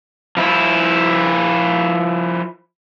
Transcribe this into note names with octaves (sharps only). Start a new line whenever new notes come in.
F3 E4